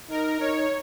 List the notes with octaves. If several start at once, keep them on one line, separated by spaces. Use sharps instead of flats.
D#4 A#4
D#4 C#5